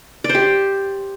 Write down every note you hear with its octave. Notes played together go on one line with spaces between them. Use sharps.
D5
C5
G4